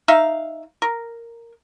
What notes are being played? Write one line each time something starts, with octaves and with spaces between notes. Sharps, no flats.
D#4 E5 F5
A#4